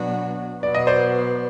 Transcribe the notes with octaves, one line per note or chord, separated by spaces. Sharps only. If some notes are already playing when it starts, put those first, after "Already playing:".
Already playing: B2 F#3 B3 D4 F#4
B2 F#3 B3 D5
D#5
C5 D5